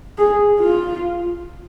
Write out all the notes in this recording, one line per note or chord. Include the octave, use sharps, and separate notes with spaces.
G#4
F4